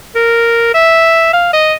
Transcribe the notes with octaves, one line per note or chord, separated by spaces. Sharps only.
A#4
E5
F5
D#5